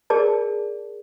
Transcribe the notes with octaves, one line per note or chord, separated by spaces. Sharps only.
G#4 A#4 D5 A5